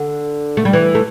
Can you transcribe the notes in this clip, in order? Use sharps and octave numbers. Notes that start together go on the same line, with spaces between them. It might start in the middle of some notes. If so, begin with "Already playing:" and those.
Already playing: D3
A3
G3
E3
A3